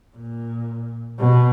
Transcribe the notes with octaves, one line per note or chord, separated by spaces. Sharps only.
A#2
B2